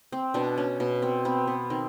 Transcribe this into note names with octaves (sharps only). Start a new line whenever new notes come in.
C4
B2 D4
C#4
B2
C4
B3 C4
B3
D#3 C4